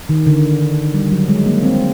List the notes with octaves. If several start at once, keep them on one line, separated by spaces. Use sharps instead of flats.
D#3
D3
G3
F#3
G#3
A#3
C4